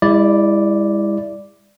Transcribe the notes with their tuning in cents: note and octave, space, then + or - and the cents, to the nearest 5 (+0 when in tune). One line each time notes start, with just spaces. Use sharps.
G#3 -40 E4 +0 D5 +0